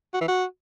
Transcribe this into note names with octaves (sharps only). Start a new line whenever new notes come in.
F#4
E3
F#4